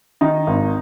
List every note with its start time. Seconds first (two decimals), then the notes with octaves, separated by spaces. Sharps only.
0.21 D#3 D#4
0.47 G#1